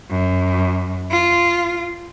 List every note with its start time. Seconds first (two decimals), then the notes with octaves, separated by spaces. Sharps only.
0.10 F#2
1.11 F4